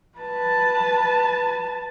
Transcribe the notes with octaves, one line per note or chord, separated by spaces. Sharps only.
B4 A5